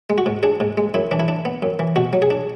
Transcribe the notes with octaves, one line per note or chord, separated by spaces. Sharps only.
G#3
F#4
G#2
D4 G#4
G#2
G#3
F#2 E4
E3 D4
E4
D4
B3
F#2
E3
B2 F#4
F#3
G#4
D4